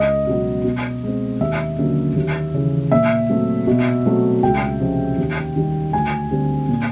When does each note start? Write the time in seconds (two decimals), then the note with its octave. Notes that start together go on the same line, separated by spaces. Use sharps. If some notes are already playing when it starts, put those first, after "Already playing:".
Already playing: C#2 D#5
0.27 B2 F#3 B3
0.64 B2
1.03 G#3 C4
1.40 D#2 E5
1.78 D3 F#3 A#3 C#4
2.16 D#2
2.54 C#3 E3
2.92 A#2 E5
3.30 F#3 A3 C4
3.67 B2
4.05 F#3 A3 C4
4.43 C#2 G5
4.80 C3 F3 G#3 C#4
5.18 D#2
5.56 D#3 G3
5.93 D2 G#5
6.31 D3 G3 C4
6.69 A#2